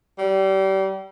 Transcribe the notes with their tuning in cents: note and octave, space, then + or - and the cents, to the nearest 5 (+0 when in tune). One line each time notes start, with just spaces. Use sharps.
G3 -30